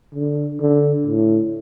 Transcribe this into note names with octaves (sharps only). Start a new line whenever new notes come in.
D3
D3
A2